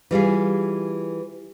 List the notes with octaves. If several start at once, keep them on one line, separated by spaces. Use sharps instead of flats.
E3 G3 F4 G#4